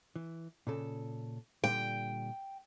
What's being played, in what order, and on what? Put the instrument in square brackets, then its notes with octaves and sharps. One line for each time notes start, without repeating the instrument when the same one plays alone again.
[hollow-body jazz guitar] E3
A#2 C#3 A4
[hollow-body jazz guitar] A#2 D3 G3 [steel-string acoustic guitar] G5